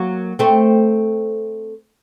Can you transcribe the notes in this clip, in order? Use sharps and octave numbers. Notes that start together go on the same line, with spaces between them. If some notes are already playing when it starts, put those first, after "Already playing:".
Already playing: F#3 A#3
A3 C4